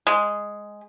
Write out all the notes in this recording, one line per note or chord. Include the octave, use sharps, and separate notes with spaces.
G#3